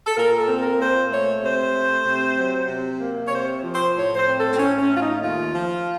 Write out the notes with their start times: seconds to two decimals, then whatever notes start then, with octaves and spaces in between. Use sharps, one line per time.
0.07 A4
0.17 A#2 A#4
0.37 A4
0.48 C4
0.58 A#4
0.80 A#2 C5
1.11 A3 C#5
1.42 C3 C5
1.74 A3
2.06 C3
2.37 F#3
2.69 C3
3.00 A#3
3.26 C#5
3.31 C3 C5
3.63 F3
3.73 C5
3.94 A2 C#5
4.15 C5
4.26 C4
4.37 A4
4.53 C4
4.57 A2 C#4
4.79 C#4
4.89 A3
4.94 F4
4.99 D#4
5.20 D#2 F4
5.52 F3